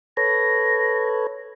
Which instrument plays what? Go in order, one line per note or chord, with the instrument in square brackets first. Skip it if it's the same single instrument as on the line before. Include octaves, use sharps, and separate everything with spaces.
[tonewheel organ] A4 B4 C#5 [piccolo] A#6